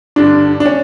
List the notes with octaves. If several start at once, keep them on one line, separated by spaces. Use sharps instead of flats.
G2 D3 D4
D4
C#4